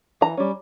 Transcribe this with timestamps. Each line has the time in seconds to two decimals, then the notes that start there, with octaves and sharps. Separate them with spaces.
0.21 E3 A#5
0.37 G3 C#4